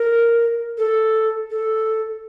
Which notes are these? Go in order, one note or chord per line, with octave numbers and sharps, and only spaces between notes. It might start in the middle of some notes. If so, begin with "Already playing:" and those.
Already playing: A#4
A4
A4